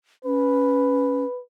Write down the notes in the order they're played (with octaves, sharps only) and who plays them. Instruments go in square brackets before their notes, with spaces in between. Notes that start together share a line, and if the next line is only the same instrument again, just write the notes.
[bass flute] C#4 [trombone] B4